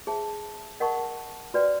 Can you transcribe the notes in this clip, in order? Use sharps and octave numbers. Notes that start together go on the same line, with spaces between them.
G#4 C5 E5 A5
A#4 D#5 F#5 A5 C#6
F#4 B4 D5 G5